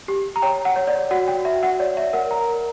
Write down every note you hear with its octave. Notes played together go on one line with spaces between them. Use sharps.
G4
A#5
C#5 G5
F#5
C#5
D5
F#4 F#5
G5
F#4 E5
F#5
C#5 D5
E5
A#4 F#5
A#5
A#4